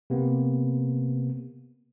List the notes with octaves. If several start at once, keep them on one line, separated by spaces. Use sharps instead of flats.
C3 A#3 B3